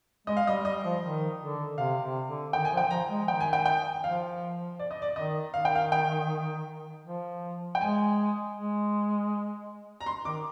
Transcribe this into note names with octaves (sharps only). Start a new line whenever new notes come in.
G#3 D#5
F5
G3 D#5
G3 D#5
F3
D#3
D3
C3 F5
C3
D3
D#3 G5
G#5
F3
G5
F3 A#5
G#3
D#3 G5
G#5
G5
G5
F3 F5
D5
D#5
D5
D#3 D#5
D#3 F5
G5
F5
G5
F3
G5
G#3 G#5
G#3
A#5
C6
D#3 D6